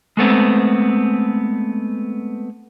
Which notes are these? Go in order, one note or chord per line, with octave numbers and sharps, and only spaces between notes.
G#3 A3 B3 C4